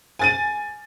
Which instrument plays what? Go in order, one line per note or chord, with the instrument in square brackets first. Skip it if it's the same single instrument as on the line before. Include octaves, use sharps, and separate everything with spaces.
[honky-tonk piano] G#5 A6 D#7